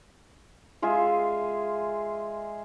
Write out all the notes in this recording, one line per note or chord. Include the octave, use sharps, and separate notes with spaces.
G#3 F4 G#4 E5